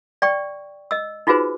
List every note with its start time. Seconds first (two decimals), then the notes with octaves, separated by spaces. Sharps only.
0.22 D5 G5 C#6
0.91 D#5 E6
1.27 D#4 F4 F#4 G#4 B4 C5